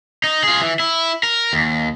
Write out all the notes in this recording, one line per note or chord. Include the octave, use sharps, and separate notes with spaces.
D#4
F4 G#4
E3
E4
A#4
D#2